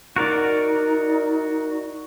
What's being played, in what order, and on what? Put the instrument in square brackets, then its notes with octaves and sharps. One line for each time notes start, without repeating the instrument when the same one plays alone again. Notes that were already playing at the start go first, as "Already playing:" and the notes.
[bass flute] D#4 [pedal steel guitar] F#4 A#4 D5